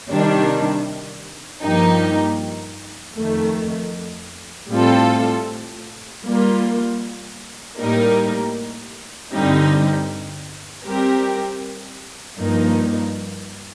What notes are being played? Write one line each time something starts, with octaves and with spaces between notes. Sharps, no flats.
C3 D#3 G3 D4
G2 F3 A#3 D#4 G4
F2 D#3 A3
A2 G3 C4 F4 A4
G3 A#3 F4
A2 G3 A#3 D#4 A#4
G2 D3 G3 C4 D#4
G3 C4 G4 A#4
G2 F3 A#3 D#4